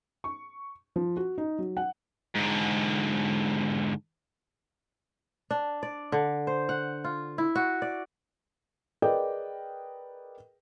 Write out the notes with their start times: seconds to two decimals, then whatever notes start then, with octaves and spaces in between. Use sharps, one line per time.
0.24 C#6
0.96 F3
1.17 F#4
1.38 D#4
1.59 F#3
1.77 F#5
2.35 G#2 D3
5.51 D4
5.83 D5
6.12 D3
6.47 C5
6.69 F#5
7.04 F4
7.38 E4
7.56 F#4
7.82 D5
9.02 G#4 A#4 B4 D5 D#5 G5